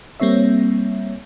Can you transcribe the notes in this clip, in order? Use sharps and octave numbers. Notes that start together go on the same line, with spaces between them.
G3 A#3 C4 C#5 E5